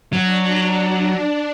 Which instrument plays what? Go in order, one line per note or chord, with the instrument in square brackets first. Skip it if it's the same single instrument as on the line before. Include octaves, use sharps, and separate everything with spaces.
[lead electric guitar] F#3 [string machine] D4